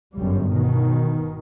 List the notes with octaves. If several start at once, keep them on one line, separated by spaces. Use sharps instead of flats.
G1 F#2 G3
B2 D#3